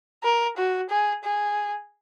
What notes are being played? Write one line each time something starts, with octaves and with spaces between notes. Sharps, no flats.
A#4
F#4
G#4
G#4